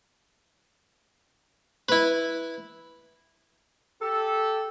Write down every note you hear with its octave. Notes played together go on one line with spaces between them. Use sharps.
E4 B4
G4 A4